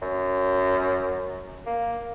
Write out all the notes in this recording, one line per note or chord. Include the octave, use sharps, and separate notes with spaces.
F#2
A#3